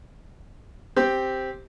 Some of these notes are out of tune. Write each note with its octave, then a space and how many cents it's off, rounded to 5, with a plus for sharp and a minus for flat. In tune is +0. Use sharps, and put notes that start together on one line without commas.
C4 +0 G4 +0